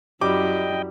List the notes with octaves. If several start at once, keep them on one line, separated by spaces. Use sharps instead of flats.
F#2 G3 E4 D#5 G5 D6